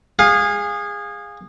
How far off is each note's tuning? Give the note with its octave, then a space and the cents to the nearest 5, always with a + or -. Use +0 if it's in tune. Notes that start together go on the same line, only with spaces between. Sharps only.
G#4 -20 F5 +20